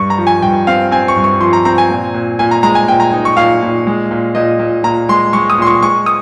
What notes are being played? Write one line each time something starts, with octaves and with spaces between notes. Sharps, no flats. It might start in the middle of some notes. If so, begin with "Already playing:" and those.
Already playing: G2 C#6
A#5
F3
G#5
G2 G5
C4 F5
C4 G#5
C#6
G2
C#6
F3 C6
A#5
C4 A#5
G#5
A#2
A#2
A#2 G#5
A#5
G#3 A#5
G#5
A#2 G5
A#5
D#4
C#6
A#2 F5
A#2
G#3
A#2
A#2 D#5
A#2
A#2 A#5
G#3 C6
G#3 C#6
D#6
A#2 C6
C#6
G#3 C#6
D#6